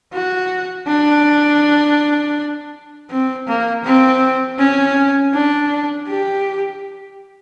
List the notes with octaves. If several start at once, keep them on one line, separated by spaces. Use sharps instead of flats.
F#4
D4
C4
A#3
C4
C#4
D4
G4